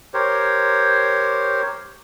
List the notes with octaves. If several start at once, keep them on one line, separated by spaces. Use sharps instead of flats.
G4 A#4 C5 C#5